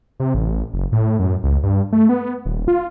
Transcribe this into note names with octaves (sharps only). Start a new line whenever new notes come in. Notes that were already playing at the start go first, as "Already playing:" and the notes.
C3
A1
F#1
A2
F#2
C#2
G2
A3
B3
D#1
F4